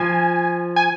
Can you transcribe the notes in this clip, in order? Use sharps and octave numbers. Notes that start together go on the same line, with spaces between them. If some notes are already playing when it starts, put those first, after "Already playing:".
Already playing: F3 G#5
G#5